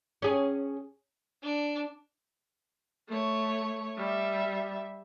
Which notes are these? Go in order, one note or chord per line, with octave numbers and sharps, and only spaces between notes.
C#4 G#4
D4
A3 C#5
G3 E5